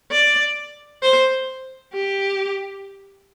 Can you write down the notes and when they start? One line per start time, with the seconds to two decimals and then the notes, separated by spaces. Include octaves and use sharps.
0.11 D5
1.03 C5
1.94 G4